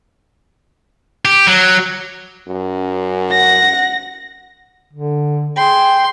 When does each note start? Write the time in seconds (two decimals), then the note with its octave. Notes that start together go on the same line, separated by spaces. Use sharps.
1.25 G4
1.47 F#3
2.48 F#2
3.31 F#5 A#6
4.93 D3
5.57 G#4 G5 C6